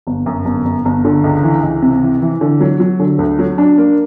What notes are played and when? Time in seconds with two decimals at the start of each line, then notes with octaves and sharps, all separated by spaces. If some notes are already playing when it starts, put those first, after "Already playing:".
0.07 G1
0.26 F#2
0.45 G1
0.65 G1
0.85 G1
1.05 D3
1.24 C#2
1.43 E3
1.63 C#2
1.82 C3
2.02 E3
2.22 E3
2.41 D3
2.60 F#3
2.80 F#3
3.00 D3
3.19 D2
3.39 F#3
3.58 D4
3.78 A#3